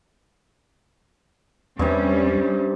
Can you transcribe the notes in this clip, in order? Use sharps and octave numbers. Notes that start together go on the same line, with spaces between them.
E2 G2 C3 G3 C#4